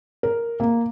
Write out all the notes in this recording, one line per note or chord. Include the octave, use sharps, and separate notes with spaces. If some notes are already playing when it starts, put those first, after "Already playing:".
A#4
A#3